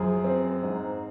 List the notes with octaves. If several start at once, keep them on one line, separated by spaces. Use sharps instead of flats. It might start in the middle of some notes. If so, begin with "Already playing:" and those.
Already playing: F#2 F3 G#4
C4
G#2